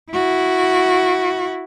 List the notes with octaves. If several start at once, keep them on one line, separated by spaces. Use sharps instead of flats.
E4 F#4